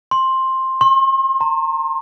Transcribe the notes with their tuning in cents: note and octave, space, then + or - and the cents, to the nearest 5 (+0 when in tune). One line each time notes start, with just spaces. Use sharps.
C6 +10
C6 +40
A#5 -35